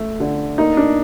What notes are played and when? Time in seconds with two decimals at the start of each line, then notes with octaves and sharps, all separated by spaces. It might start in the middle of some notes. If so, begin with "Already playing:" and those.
Already playing: A3
0.20 D3
0.58 A#3 D#4
0.77 D4